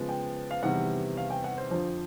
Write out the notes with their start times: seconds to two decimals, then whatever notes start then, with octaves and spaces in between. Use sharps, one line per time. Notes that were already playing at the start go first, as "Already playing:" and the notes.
Already playing: C#3 F3 G#3 B3
0.09 G5
0.51 F5
0.63 E2 C3 D#3 G3 B3 F#5
1.17 F5
1.30 G5
1.44 F#5
1.58 C5
1.71 F2 D3 F3